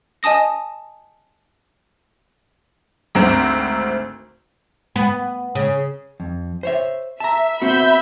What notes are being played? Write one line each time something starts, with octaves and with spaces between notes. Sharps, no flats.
D#5 G#5 A5 D#6 A#6
G#1 D2 C4 C5 A#5
B3
C#3
F2
C5 C#5 E5
E5 A5 A#5
B3 C4 F#4 E5 B5 G6